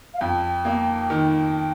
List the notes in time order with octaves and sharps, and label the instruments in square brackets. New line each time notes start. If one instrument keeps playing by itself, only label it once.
[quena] F5
[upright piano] F2 [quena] G5
[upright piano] A#3
D#3